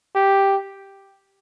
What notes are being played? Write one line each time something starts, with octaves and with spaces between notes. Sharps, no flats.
G4